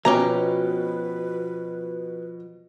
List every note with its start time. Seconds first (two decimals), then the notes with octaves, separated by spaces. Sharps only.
0.05 B2 F3 C#4 G4 B4 A#5